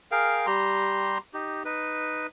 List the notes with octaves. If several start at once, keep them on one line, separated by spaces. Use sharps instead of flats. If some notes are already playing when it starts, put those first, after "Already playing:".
G#4 A#4 F5 G5
G3 G4 A#5 C6
D#4 G4
D#4 B4